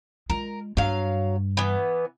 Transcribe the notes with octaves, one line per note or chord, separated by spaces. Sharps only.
G#3 F4 A#4
G2 F#3 D4 F5
E3 B3